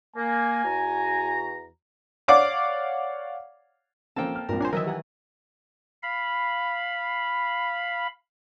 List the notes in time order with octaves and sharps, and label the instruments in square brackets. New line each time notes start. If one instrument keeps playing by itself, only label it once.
[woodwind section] A#3 [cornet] G#5
[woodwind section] E2 F#4 A#5
[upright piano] C#5 D5 F5 F#5 D6
[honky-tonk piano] A#1 C#4 [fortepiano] A#3 C4 A4 [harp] G5 A5
[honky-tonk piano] F6
[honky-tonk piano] C2 A#2 [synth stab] G2 [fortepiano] F3 [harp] A#4
[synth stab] D4 C5 [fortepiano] C#5 G#5
[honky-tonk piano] D#3 F#3 [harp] E3 [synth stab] A#4 D#5 E5
[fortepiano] G3 F#5 G#5
[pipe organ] F5 B5